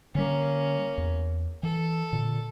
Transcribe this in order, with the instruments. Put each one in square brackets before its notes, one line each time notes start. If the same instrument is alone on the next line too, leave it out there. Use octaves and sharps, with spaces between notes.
[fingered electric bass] D3 G3 [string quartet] A#3 C#4
[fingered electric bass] E2
[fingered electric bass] E3 [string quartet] A4
[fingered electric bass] A#2 D3